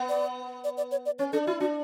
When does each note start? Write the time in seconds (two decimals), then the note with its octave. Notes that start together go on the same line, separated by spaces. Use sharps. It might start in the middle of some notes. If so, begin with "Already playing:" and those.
Already playing: B3
0.09 D5
0.64 D5
0.77 D5
0.91 C#5
1.06 D5
1.19 C#4 C#5
1.33 D4 A4
1.46 E4 F#4
1.60 D4 F#4